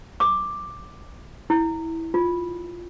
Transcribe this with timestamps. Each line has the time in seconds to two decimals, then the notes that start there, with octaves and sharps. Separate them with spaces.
0.20 D6
1.50 E4
2.14 F4